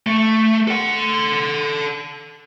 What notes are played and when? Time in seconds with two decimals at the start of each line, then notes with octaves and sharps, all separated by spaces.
0.07 A3
0.68 A4 F#5